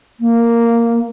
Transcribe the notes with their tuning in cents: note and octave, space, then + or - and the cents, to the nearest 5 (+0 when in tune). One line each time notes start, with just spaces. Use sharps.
A#3 -5